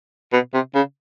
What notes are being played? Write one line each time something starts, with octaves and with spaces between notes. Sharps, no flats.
B2
C3
C#3